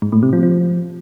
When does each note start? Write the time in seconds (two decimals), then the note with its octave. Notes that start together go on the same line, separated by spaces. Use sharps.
0.02 G#2
0.12 A2
0.23 C3
0.33 F3
0.43 F3